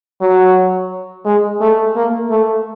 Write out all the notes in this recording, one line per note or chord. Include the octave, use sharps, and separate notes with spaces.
F#3
G#3
A3
A#3
A3